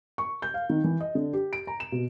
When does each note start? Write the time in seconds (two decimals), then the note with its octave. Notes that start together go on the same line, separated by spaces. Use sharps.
0.18 C#6
0.42 G6
0.54 F5
0.70 D#3
0.84 E3
1.00 D#5
1.15 D3
1.33 G4
1.53 D7
1.67 A#5
1.80 E7
1.92 B2